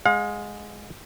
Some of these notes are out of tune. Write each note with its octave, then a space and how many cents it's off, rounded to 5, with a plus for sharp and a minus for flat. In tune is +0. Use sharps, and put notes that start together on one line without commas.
G#3 +0 F5 +45